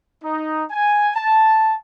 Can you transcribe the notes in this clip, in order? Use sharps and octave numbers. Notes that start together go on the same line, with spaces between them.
D#4
G#5
A5